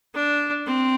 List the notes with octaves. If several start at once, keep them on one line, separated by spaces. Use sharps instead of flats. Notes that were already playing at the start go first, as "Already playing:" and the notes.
D4
C4